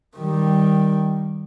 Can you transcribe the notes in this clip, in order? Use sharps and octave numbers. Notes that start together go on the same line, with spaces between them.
D#3 G3